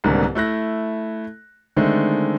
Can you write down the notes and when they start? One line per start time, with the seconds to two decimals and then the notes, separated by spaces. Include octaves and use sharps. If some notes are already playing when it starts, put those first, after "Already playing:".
0.04 C2 G#2 D3 D#3 A#3 B3
0.35 A3 E4 F#6 A#6
1.77 D3 D#3 G#3 A3 C4